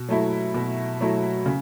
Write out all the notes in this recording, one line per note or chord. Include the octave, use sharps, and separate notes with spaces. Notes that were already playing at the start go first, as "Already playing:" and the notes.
Already playing: B2
F#3 A3 E4
B2
F#3 A3 E4
C#3